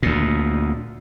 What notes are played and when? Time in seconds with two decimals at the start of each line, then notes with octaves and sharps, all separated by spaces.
0.03 D2 A#2